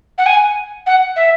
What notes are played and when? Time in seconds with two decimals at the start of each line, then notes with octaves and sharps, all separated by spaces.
0.18 F#5
0.26 G#5
0.87 F#5
1.16 E5